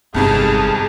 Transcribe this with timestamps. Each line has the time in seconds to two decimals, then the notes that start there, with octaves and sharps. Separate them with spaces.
0.14 G1 C2 F2 G#2 G#4 A5